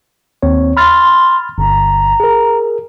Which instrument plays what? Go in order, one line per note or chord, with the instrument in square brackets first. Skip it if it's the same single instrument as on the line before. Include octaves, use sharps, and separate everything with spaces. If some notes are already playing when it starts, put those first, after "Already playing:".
[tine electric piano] D#2 C4 C#5
[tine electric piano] B5 F6 A6 [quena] C6
[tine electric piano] G1 [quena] A#5
[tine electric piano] G#4 A#4